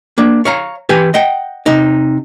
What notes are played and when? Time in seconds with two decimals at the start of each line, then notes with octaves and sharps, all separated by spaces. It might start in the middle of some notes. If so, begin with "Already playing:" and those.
0.18 A#3 D4
0.45 C#5 F5 A#5
0.89 E3 G4 B4 G#5
1.14 D#5 F#5 G5
1.66 C3 D#4